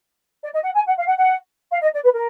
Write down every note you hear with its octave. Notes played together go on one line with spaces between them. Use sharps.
D5
D#5
F#5
G#5
F#5
F5
F#5
F#5
F5
D#5
D5
B4
A#4